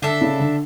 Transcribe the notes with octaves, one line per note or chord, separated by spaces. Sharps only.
D3 D4 A4 E5
C#3
D3